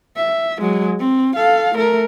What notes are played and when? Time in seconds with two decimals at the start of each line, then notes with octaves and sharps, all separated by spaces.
0.17 E5
0.61 F#3 G#3
0.99 C4
1.36 A4 F5
1.75 A3 A#4